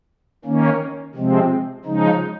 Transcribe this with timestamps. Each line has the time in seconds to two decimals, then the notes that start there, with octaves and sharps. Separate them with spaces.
0.45 D#3 A#3 C#4
1.15 C3 F3 G#3 C4
1.85 C#3 F3 G#3 D#4